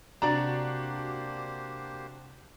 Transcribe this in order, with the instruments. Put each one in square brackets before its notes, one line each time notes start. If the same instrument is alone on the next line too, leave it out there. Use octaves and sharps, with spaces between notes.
[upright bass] C3 [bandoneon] A#3 G4 C5 [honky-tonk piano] D4 F#4 [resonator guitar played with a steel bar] D5 A#5